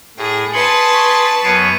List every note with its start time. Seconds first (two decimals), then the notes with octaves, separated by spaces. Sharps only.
0.17 A2 G#4
0.53 G#4 B4 A5 C6 C#7 F#7
0.94 C#6
1.44 F#2 B3 C#5 C7 D7 D#7